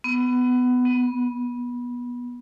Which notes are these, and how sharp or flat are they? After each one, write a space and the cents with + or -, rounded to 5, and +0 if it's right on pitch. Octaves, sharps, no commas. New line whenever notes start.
B3 +15
B3 -20